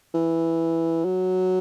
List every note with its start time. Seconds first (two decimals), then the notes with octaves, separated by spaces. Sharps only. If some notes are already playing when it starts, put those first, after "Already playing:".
0.14 E3
1.05 F#3